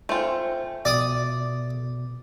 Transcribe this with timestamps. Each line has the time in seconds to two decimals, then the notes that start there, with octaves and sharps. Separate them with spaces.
0.09 A3 F4 C5 G5 G#5
0.85 B2 D5 D#6